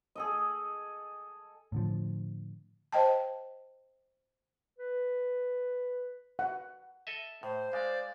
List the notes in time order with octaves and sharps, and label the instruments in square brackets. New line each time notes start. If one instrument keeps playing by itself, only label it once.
[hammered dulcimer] G#4 A4 D#5
[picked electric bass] A2 D3 F3
[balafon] C5 D#5 G5 A5
[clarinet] B4
[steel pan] F#5
[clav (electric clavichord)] A4 D#5 E5
[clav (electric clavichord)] A2 [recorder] C5
[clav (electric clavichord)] G#3 [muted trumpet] D5 [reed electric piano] F5 G#5